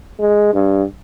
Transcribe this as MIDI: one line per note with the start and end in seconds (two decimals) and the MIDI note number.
0.19 0.52 56
0.53 0.84 43